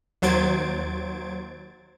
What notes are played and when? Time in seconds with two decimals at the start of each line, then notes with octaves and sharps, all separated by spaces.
0.22 D#2 F#3 C5 G#6 A6 D7